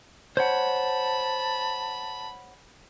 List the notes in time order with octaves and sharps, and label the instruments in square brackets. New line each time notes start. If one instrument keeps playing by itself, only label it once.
[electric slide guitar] C5 C#5 F#5 [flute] A5 [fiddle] B5